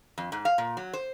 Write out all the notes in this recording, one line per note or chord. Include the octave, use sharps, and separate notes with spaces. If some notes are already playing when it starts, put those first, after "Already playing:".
F2
G#2
F5
A#2
F#3
C5